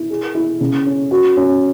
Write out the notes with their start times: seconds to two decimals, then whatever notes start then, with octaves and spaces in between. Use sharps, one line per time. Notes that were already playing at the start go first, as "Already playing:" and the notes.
Already playing: E4
0.10 G#4
0.35 E4
0.61 C#3
0.86 C#4
1.11 F#4
1.37 C#4